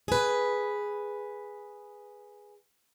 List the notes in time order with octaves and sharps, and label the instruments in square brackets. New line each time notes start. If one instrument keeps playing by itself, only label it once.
[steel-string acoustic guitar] G#4 B4